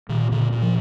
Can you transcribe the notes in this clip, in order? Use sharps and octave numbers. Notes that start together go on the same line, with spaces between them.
A#2 D#3
A#2 D3
A#2
F3